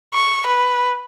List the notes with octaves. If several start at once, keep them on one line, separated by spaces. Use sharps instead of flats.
C#6
B4